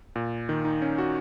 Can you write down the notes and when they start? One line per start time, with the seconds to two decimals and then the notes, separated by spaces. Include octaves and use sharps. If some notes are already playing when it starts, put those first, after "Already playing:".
0.16 A#2
0.49 D#3
0.65 D#4
0.82 C#4
0.98 F#4